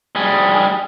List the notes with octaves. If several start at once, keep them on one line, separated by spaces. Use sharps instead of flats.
G3 G#4